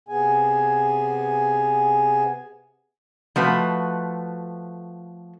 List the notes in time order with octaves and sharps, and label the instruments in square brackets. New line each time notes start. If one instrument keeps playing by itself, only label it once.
[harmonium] C3 B3 G#4 G#5
[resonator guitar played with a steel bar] F3 A3 F#4 B4